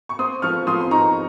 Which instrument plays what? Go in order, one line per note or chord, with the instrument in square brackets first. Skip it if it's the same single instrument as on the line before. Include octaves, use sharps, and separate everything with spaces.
[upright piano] C#6
C4 C6 D#6
F3 C#6 F6
F3 C6 D#6
C6
D#4 A#5 C#6